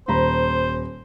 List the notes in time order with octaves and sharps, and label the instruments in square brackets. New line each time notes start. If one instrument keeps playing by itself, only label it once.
[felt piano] D#1 A#5 B5 [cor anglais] C5